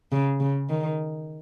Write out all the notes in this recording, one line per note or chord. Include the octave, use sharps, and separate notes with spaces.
C#3
C#3
D#3